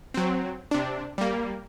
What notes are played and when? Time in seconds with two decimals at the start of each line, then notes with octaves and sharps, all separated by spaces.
0.14 F#3 C4
0.71 C3 D4
1.18 G3 A#3